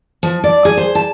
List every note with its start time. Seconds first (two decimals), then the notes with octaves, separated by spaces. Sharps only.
0.23 F3
0.44 D5
0.65 G#4
0.77 C5
0.95 A5